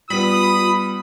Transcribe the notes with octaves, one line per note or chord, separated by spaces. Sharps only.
G3 B3 F4 B5 D#6